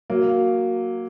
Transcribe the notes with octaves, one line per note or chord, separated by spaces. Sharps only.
F#3 A#3